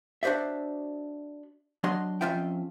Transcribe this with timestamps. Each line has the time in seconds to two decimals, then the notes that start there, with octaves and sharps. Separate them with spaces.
0.23 D4 F#4 C5 D5 E5
1.84 F#3 D4 D#5 C6
2.21 F2 C#4 F4 E5 G5